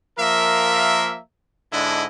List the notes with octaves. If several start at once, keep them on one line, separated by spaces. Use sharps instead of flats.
F3 A#3 A#4 E5
G#2 D3 D4 E4 D#5